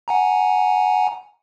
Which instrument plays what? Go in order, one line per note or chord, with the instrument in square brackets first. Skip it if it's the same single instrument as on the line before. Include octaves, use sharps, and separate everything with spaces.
[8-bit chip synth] F#5 G#5 A#5